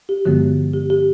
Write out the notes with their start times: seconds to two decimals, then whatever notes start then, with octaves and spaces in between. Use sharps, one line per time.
0.09 G4
0.25 G2 D3 F3 G#3 B3 F#4
0.73 G4
0.90 G4